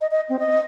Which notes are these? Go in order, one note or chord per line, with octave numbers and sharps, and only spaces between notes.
D#5
D#5
C4
D#5